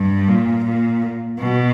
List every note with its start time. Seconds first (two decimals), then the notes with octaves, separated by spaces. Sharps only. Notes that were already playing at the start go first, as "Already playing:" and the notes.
Already playing: G2
0.28 A#2
0.65 A#2
1.40 B2